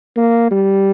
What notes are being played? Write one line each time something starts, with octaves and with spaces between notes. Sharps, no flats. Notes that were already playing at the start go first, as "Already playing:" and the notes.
A#3
G3